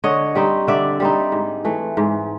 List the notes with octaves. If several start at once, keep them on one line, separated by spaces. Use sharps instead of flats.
D3 C#5 D#5
G3 C4 D#4
D3 D5 E5
G3 C4 D#4
G#2
E3 A3
G#2